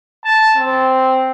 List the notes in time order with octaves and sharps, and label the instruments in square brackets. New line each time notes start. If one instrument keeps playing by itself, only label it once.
[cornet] A5
C4